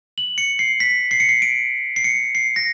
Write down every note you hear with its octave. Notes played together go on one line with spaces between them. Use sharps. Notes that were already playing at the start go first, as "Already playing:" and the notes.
F#7
C#7
C7
B6
C7
C#7
C7
D7
C7
C#7
C7
A#6